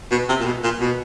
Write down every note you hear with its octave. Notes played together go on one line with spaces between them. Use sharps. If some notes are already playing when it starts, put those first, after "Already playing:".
B2
C3
A#2
B2
A#2
B2